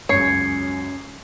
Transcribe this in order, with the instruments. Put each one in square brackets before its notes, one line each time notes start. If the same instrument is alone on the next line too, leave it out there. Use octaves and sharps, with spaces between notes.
[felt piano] C#2 F#2 [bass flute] C#4 [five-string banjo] C#5 [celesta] G#6 C7 C#7